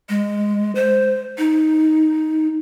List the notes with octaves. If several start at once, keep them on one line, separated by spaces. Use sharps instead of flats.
G#3
C5
D#4